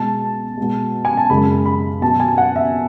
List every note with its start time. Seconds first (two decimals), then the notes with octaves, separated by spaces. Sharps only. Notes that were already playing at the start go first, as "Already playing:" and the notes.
Already playing: B2 G#3 A5
0.57 B2 G#3
1.05 G#5
1.17 A5
1.30 F#2 C#3 G#3 B5
1.66 B5
2.01 B2 F#3 A5
2.20 G#5
2.38 F#5
2.56 E5